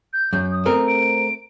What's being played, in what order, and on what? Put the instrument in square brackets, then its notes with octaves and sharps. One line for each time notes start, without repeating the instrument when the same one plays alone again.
[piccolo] G6
[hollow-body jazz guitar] F#2 [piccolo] G6
[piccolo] D#6
[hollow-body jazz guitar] A3 C4 A#4
[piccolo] D7